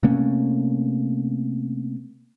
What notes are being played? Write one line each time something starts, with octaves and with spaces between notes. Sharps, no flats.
C3 A3 A#3 C#4